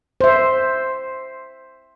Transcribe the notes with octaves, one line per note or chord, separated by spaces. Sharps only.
C5 E5